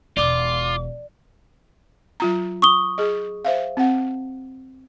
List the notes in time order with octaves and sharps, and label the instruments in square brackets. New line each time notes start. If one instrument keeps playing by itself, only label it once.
[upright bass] E1 [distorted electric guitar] F4 [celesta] D5 [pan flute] D6
[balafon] F#3 F4 A#5
[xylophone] C#6 D#6 G7
[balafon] G#4 D#5
C5 E5 F5
C4 F#5